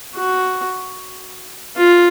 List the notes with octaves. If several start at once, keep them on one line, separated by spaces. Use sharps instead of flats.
F#4
F4